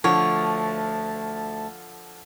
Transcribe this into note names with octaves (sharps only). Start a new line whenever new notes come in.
D2 D3 F3 A3 C#5 A5